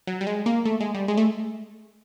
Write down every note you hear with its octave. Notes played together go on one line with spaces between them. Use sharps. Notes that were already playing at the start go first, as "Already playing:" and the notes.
F#3
G3
G#3
A#3
A3
G#3
G3
G#3
A3